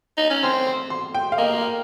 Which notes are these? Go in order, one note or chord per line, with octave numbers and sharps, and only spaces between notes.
D#4
C#4
C4 C6
C6
C6
G5
F5
A#3 D#5